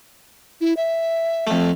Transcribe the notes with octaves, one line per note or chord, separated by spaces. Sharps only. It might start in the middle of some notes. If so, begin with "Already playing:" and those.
E4
E5
F2 A3